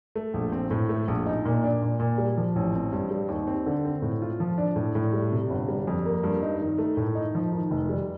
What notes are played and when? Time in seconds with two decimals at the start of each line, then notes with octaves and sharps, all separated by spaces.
0.16 A3
0.34 A#1
0.52 C4
0.71 A2
0.89 A3
1.08 A#1
1.26 D#4
1.45 A#2
1.64 D4
1.82 A#2
2.00 A#2
2.18 G3
2.38 F3
2.56 A1
2.74 C4
2.92 G2
3.11 G3
3.28 D#2
3.47 C4
3.66 D3
3.85 C4
4.02 A2
4.22 F4
4.40 F3
4.58 D4
4.76 A2
4.95 A2
5.13 G3
5.32 C3
5.50 G1
5.68 G3
5.87 F2
6.06 A#3
6.23 G2
6.43 D#4
6.60 D#3
6.78 A3
6.97 A2
7.15 D#4
7.35 F3
7.52 D#3
7.71 F1
7.89 G3